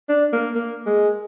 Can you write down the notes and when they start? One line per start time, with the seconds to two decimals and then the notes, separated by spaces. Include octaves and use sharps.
0.09 D4
0.33 A#3
0.55 A#3
0.86 G#3